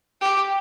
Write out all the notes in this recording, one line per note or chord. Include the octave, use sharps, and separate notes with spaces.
G4